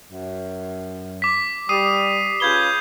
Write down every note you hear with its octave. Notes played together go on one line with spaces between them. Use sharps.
F#2
D6 B6
G3 D#6 C7 D#7
C#3 F4 B4 G6 G#6 G7